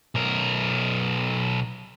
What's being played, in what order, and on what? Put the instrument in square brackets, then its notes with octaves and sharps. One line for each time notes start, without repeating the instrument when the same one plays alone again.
[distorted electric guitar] B1 A#4